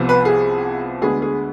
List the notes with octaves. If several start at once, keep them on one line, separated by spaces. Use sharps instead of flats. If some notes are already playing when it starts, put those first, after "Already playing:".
Already playing: C2 C3 F3 B3
B4
G#4
D2 D3 G#3 B3 G#4
G#4